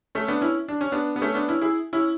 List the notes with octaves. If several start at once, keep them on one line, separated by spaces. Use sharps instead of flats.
A3 C#4
B3 D4
C#4 E4
D4
C#4
B3 D4
B3
A3 C#4
B3 D4
C#4 E4
E4 G#4
C#4 E4